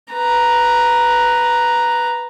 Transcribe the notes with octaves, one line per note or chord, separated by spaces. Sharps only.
B4 A#5